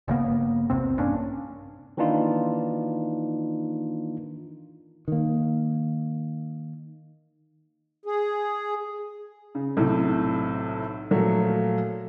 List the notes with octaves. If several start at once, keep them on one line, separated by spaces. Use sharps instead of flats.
G1 C#3 A#3 B3
A#1 E2 C3 C4
G2 A#3 C#4 D4
D#3 E3 A#3 D4 D#4 F4
D#3 A#3
G#4
C#3
B1 A2 C3
A#2 F3 F#3 A3 F#4